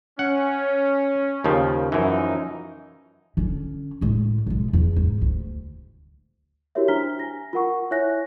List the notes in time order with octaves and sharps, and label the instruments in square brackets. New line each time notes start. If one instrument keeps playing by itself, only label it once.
[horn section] C#4 [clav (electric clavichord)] F#5
[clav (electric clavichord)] D#2 C#3 F3
[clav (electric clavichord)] F#2 E3 [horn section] F3 C#4 D#4
[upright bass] D3 C#4
A2 G#3
B2 G#3
E2
G#2
D2
[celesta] E4 F#4 G4 A#4 C#5 E5
D4 C5 A#5 F6 B6 G7
G#5 A#6
F4 A#4 F#5 C#6
E4 C#5 E5 G#5 F#6 A#6